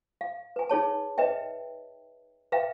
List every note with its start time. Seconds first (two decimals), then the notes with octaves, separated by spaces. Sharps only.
0.21 F5
0.56 B4 G#5
0.69 D#4 G#4 C#5 A5
1.18 B4 D#5 E5 G5
2.52 B4 E5 F5 G5